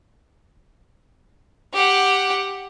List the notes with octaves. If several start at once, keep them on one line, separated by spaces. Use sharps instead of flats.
G4 F#5